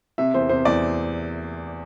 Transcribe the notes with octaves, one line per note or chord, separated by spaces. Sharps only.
C3 E5
E2 C5
C3 C5
E2 D5